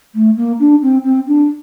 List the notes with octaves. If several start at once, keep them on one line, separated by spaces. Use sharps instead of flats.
A3
A#3
D4
C4
C4
D4